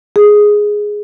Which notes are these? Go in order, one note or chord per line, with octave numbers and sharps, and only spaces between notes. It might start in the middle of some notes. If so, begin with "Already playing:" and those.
G#4